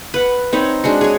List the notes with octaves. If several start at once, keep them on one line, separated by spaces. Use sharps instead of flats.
B4 F#5
C4 D#4 C#5 B5
G#3 D4 F#4
G#4 C#5